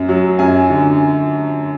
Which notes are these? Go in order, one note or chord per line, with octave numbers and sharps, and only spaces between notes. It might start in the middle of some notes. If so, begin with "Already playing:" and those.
Already playing: F#2
F#3
F#2 G#5
D3